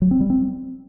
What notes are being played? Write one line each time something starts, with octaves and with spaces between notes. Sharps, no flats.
F#3
C4
G3
C4